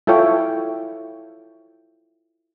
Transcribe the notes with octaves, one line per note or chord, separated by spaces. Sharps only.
E4 F4 A4 C#5 G5